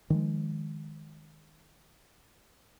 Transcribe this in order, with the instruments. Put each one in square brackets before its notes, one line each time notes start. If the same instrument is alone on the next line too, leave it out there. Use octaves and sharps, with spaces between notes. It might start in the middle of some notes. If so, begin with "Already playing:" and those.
[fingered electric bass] D#3 F3 G#3